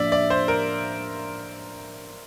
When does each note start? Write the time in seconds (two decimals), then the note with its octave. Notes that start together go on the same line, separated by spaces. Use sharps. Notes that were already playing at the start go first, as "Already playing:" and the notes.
Already playing: A2 F3 A#3 D4 D5 E5
0.12 D5
0.30 C5
0.48 A#4